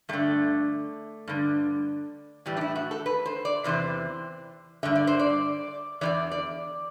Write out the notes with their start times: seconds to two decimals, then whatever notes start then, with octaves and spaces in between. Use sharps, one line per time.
0.09 G2 D3 A3
1.28 G2 D3
2.46 A2 E3 G3
2.57 D4
2.61 E4
2.76 F#4
2.91 A4
3.06 B4
3.26 C5
3.45 D5
3.64 E2 C3 E3 C5
4.83 G2 D3 E5
4.95 D5
5.07 C5
5.19 D5
6.01 E2 C3 E3 D5
6.31 D5